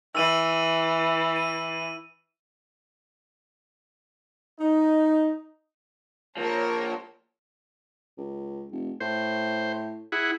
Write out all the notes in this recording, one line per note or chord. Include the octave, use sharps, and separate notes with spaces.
E3 E6 D#7 F#7
D#7
D#4
F3 A#3 A#4 C#5 A5
C#2
F1
A2 C5
E4 G#4 F#5